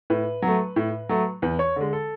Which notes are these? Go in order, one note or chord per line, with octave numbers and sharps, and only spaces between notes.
A2 B4
F#3
A3
A2
F#3 A3
E2 B4
C#5
D3 G#3
A4